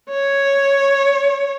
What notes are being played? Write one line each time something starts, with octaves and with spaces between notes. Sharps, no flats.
C#5